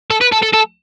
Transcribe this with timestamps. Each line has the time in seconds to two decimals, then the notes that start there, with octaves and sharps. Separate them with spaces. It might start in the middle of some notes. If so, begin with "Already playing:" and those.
0.11 A4
0.21 B4
0.32 A4
0.43 A4
0.54 A4